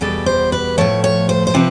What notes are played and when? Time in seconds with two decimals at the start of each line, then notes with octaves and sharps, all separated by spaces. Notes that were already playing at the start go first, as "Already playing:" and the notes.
0.01 E2 B2 G3 A4
0.26 C5
0.52 B4
0.78 A2 F3 A3 C#5
1.04 C#5
1.29 C5
1.47 C5
1.54 C3 F3 C4 B4